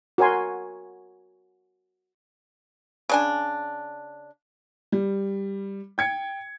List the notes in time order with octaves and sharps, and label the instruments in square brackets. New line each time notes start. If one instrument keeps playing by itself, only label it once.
[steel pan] F#4 A#4 C#5 G#5 C6
[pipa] C#3 D4 G#5
[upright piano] G3
G5 G#6 C#7